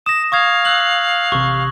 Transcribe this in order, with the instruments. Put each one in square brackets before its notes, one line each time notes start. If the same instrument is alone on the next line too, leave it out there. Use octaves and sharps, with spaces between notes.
[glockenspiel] D#6 A#6 [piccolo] E7
[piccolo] F5 [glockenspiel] C#6 D#6 G#6
[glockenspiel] E6 F#6 F#7
[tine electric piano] A1 C3 [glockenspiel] C#6